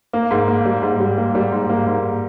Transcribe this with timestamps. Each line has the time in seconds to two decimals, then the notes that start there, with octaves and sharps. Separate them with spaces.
0.13 A#3
0.31 G#2
0.48 A#3
0.65 G3
0.83 G#2
1.00 G3
1.17 A#3
1.35 G3
1.52 G#2
1.69 A#3
1.86 G#2